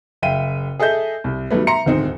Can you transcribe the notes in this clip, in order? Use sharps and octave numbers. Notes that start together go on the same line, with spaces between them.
F#1 E5 F5 G5 D#7
G#4 A4 D#5 E5 G6
C2
D#3 F#3 G3 A3 B3
E5 A#5 C6 C#7
D#1 D2 G#2 C4 D#4